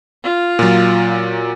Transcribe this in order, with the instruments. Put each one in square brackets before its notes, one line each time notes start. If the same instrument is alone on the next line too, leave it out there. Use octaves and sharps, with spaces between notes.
[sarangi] F4
[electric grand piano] A#2 F#3